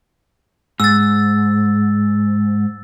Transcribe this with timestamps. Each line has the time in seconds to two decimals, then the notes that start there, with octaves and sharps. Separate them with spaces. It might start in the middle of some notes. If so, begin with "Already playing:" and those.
0.80 G#2 E6 A6